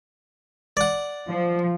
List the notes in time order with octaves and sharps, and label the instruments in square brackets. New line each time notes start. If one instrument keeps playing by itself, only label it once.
[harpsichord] D5 F#5
[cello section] F3